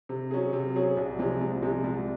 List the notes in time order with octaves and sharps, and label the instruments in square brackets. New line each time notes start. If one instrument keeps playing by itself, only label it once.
[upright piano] C3
F#3 C#4 G#4
C3
F#3 C#4 G#4
C2
C3 F3 G#3
C2
C3 F3 G#3
C2